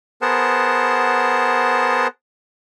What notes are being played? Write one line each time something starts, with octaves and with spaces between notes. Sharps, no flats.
B3 G#4 A#4 C5 F#5 A5